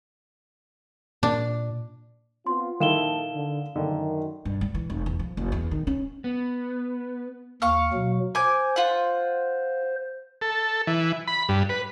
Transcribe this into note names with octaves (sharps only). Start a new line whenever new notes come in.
A#2 D4
B3 C4 F4 C6
A#1 D#3 E4 A4 F5 E7 G7
D3
F#2 D3 D#3
G2
G3
E3
F1
E2
F3
F#1
E2
D#3
C#4
B3
D#2 F5 C#6
B2 F#3
C5 G#5 D6
F4 F#5
A4
E3
B5
G2
B4